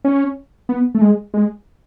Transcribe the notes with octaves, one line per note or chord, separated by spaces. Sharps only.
C#4
B3
A3
G#3
G#3